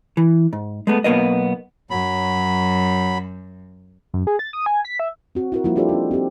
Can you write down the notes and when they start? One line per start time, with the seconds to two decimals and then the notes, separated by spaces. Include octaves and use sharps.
0.17 E3
0.53 G#2
0.87 G#3 A3 B3
1.04 B1 A#2 A#3 B3 D#5
1.90 F#2 F#3 B5
4.14 F#2
4.27 G#4
4.39 A6
4.53 D#6
4.66 G#5
4.85 B6
5.00 E5
5.35 C4 F#4
5.52 E4 F#4 A#4
5.64 F3 G3 A#3 E4 F4
5.76 D4 F4 G4 A4 C5 D5
5.89 C4 D#4
6.11 C4 G4